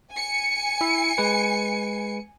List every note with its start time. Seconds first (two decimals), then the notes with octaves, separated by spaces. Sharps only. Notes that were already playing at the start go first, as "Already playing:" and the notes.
0.13 G#5 C#7
0.81 E4 E5
1.18 G#3 B4